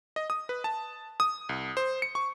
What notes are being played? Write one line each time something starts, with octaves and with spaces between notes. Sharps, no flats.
D#5
D#6
B4
A5
D#6
C2
C5
C#7
C#6